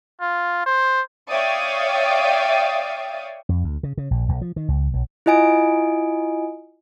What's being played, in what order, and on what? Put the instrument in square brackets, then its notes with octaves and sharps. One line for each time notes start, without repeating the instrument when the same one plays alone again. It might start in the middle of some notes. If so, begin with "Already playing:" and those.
[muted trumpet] F4
C5
[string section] C#5 D5 E5 F5 G5 D#6
[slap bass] F2
D2
C#3
C#3
A#1
B1
F3
D#3
C#2
B1
[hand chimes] E4 F4 D#5 G#5 D7